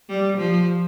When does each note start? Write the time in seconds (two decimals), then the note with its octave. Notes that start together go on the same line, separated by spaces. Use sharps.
0.09 G3
0.38 F3